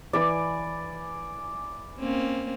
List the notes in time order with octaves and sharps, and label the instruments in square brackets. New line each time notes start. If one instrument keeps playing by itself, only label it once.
[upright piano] E3 [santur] D5 G#5 B5
[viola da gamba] A#3 C4 C#4